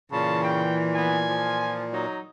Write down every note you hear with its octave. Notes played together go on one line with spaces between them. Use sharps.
A#2 C#3 E3 A5
G5
B3 G#5
F3
F#3 D#4